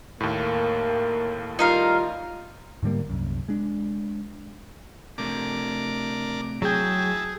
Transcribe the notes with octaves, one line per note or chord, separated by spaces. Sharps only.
D#2 A2 A#3
G3 D#4 F4 A#4 F5
G#2 D3 G3 A#3
C2 F#2
G#3 D4
C3 A3 D4 A#4 D6
F#3 E4 G#4 G5 A5